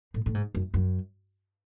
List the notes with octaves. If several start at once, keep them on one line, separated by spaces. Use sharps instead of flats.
A2
A2
G#2
F#2
F#2